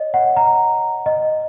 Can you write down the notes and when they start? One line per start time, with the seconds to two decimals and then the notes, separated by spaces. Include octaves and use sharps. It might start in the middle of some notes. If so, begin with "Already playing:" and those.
Already playing: C#5 D#5
0.14 F#5
0.37 A#5
1.06 D#5